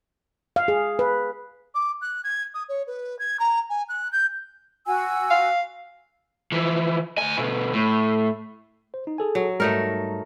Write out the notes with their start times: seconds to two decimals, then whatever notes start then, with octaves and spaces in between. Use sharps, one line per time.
0.56 F5
0.68 G#4
0.99 B4
1.75 D6
2.01 F#6
2.24 G#6
2.54 D#6
2.69 C#5
2.87 B4
3.19 G#6
3.39 A#5
3.70 G#5
3.89 F#6
4.12 G6
4.86 F#4 G#5 E6
5.30 F5
6.52 E3 F3
7.18 D2 G#5
7.38 B2 D3
7.73 A2
8.94 C5
9.07 D#4
9.18 G#4 A4 G#5
9.35 F#3
9.60 G#2 G3 A3 D#4 A#4